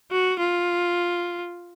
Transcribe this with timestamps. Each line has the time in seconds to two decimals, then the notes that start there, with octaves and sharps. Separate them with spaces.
0.11 F#4
0.40 F4